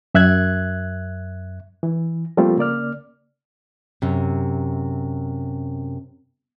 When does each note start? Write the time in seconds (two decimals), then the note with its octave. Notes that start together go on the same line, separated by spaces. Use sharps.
0.15 F#2 E5 F#6 G#6
1.83 E3
2.37 F3 G3 A3 A#3 C4 F4
2.58 C#3 A#3 D5 F6
4.02 F#2 C3